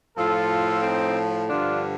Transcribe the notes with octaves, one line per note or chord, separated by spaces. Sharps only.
A2 F3 F4 A4
C4 D#4
G2 D3 F3 D4 F4